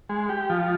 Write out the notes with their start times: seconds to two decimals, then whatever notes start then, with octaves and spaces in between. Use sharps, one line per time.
0.09 G#3
0.29 G4
0.50 F3